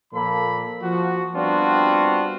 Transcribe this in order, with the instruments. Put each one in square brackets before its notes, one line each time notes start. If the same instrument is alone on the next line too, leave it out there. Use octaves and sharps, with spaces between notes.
[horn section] A#2 F3 A#3 A4 B5
F3 F#4
G3 B3 C4 D4 F4 F#4